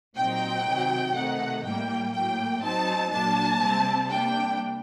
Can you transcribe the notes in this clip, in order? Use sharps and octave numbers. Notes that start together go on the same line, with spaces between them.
A#2 F#3 C4 D#4 G5
C3 D#3 F#3
C3 D#3 A3 D#4 F#5
A2 G3 A#3 G5
A2 F#3 A#3 G5
F#3 C4 D#4 A5
A#2 F#3 A#3 D4 A5
C3 G3 C4
C3 G3 A#3 D4 G5